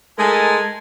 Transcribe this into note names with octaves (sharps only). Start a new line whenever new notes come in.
G#3 A3 D#4 A#4 G#5 A5